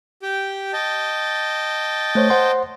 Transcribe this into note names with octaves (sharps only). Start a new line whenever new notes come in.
G4 G5
D#5 G5 A5
A3 C5 C#5
C5 F#5 C6